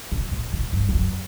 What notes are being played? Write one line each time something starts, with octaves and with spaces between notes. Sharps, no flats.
A#2
A#2
A2
G2
F2
F#2